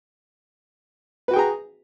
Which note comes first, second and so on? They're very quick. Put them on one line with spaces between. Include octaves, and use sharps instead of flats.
B4 F#4 G5 G#4 A#5